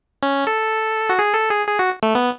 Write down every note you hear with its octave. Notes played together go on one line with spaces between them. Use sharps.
C#4
A4
F#4
G#4
A4
G#4
G#4
F#4
A3
B3